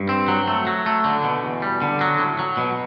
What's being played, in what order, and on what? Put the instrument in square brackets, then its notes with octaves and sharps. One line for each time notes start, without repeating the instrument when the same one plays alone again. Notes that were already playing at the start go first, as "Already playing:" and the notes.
Already playing: [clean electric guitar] G2
C4
F#3
A3
F#3
A3
D3
B2
E2
G3
D3
F#3
A2
F#3
B2